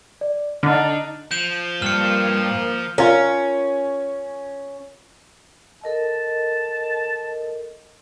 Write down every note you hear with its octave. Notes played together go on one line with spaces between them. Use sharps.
D5
D3 D4 D#4 F6 A6
F3 G6 E7
G2 A#3 F6 C#7
C#4 F4 A#4
A4 A#4 D#5 A5